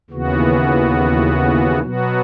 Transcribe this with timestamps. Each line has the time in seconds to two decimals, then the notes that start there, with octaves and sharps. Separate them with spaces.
0.10 D#2 C#3 E3 B3 F#4
1.81 B2 F#3 B3 F#4